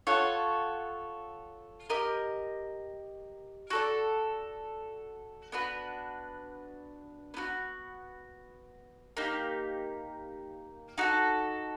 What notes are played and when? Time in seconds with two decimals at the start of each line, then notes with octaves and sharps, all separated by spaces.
0.07 F4 A4 C#5 F#5
1.90 G4 A#4 D#5
3.70 F#4 A4 D5
5.52 B3 D4 F#4 B4
7.34 B3 D#4 F#4
9.17 A#3 D#4 G4
10.98 D#4 F#4 A4